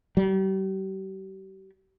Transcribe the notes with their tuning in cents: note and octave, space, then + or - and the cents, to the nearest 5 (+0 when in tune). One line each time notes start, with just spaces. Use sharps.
G3 -40